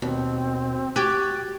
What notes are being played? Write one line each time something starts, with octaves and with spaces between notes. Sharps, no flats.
D#2 B2 C4
F#4 G4 F#6 G#6 A6